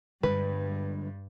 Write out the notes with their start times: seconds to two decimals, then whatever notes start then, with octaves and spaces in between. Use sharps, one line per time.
0.23 G2 D3 G3 G#3 B4